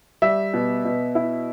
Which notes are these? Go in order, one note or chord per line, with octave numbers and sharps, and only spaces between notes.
G3 E5
B2
B2
E4